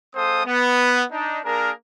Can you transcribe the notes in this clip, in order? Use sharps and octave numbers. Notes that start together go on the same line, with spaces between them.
G#3 C4 A4 C5 F5 D#6
B3
D4 D#4
A#3 D4 G#4 A#4